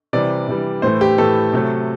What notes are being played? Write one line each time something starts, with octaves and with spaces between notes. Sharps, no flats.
C3 E3 G3 D5
C3 E3 G3
A2 E3 A3 C5
G4
A2 E3 A3 A4
C3 F#3 A3